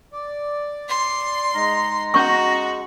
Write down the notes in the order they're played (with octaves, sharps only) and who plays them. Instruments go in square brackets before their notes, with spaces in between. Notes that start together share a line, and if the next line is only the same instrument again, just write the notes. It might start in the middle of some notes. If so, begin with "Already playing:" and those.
[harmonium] D5
[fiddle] C6
[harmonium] G#3 D#4 [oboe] A#5
[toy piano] C#4 C#6 [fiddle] F#4